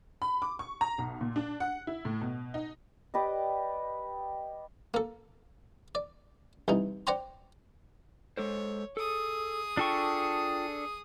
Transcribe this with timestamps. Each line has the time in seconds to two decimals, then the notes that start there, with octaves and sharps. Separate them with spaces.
0.22 B5
0.42 D6
0.59 C#6
0.81 A#5
0.98 B1
1.21 A#2
1.36 D4
1.60 F#5
1.87 E4
2.05 A2
2.21 B2
2.54 D#4
3.14 G4 B4 D5 D#5
4.94 A#3 A4
5.95 D5
6.68 C2 E3 D#4
7.07 C5 D5 F#5 G5 A#5 C6
8.37 G#3 A4 C5 C#5
8.97 G#4 A4 D#6
9.77 D4 F4 A4 G5 C#6